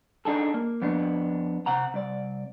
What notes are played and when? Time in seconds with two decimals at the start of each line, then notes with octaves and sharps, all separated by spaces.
0.25 D4 D#4 G#4 A4
0.54 A#3
0.82 F2 B3 D4
1.66 C3 F#5 A#5
1.94 C2 D5